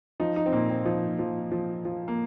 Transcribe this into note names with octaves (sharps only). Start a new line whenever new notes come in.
F3 D#4
D#4
C4
A#2 A#3
C4
F3 D#4
F3
F3
F3
A#3